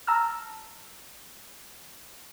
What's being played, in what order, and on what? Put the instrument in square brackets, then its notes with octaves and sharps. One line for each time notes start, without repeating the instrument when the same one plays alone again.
[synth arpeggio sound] A5 A#5 E6 F6